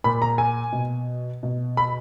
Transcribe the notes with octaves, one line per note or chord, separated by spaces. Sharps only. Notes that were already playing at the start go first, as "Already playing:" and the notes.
A#2 B5
A#5
G#5
B2
B2
B5